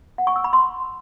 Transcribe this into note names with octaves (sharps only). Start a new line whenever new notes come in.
F#5
C#6
E6
B5
C6